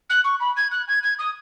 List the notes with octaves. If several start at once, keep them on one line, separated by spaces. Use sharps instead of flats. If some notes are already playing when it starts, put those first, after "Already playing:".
F#6
C#6
B5
G#6
F#6
G#6
G#6
D#6